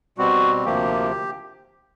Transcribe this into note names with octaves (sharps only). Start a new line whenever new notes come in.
B2 G3 C4 F#4
D2 C3 F3 A#3 G4